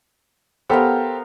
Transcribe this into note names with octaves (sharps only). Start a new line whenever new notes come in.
B3 G4 A4 A#4 C5 F5